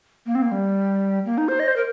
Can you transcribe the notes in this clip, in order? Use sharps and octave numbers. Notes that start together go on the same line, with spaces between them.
A#3
C4
A#3
G3
A#3
D#4
C5
D#5
C5
A#4